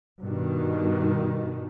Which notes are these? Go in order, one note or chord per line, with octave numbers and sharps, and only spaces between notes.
G2 B2 D#3